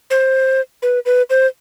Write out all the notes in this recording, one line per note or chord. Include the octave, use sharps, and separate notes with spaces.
C5
B4
B4
C5